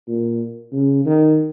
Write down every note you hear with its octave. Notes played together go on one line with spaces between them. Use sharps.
A#2
C#3
D#3